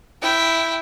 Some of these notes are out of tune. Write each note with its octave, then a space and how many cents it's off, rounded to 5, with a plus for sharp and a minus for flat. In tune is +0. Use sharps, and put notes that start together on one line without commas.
E4 +0 G5 +0